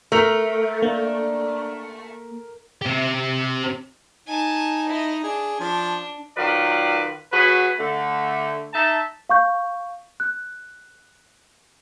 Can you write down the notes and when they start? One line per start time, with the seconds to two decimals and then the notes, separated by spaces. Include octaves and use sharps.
0.12 A3 A#4 F7
0.82 A#3 D4
2.82 C4 G4
4.27 D#4 G#5 A5
4.88 E4 D#5
5.23 D4 G#4
5.60 F3 D4
6.37 D#3 F#3 F4 B4 D5
7.32 F#3 F#4 G#4 B4
7.78 D3 A3
8.73 D#4 E5 A5
9.29 F5 C#6 G6
10.20 F#6